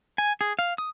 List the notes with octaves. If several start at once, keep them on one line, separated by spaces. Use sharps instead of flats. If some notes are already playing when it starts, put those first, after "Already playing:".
G#5
G#4
F5
D#6